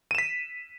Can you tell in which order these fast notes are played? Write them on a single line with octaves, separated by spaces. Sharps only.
D#7 E7 B6